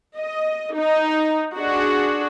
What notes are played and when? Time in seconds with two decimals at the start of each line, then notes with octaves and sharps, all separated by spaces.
0.18 D#5
0.74 D#4
1.57 D4 F#4 G#4